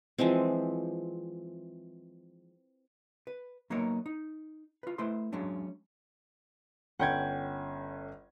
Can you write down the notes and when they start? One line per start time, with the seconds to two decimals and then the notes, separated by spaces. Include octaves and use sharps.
0.18 E3 F3 G#3 C4
3.27 B4
3.70 F#3 A#3 B3 D#4 A#4 C#5
4.06 D#4
4.83 F4 B4
4.98 A3 E4 B4 C5 C6
5.33 F#3 G#3 C#4 D4
6.99 G1 C#4 F#5 G5 G#6